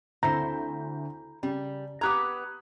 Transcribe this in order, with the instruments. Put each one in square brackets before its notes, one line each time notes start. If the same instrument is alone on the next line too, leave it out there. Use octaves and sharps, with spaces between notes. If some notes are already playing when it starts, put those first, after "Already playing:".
[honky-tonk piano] D2 C4 G6 [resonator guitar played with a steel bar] E4 A4 C5 [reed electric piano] A#5
[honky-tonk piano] C#3 [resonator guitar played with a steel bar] G3
[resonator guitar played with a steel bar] B3 G4 A#5 [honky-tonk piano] D#6 F#6 G#6